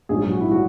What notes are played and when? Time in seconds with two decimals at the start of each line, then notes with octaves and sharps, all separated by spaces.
0.09 A#1 G#2 F#3 G#4
0.20 G#4
0.30 F#4
0.41 E4
0.51 F#3 F#4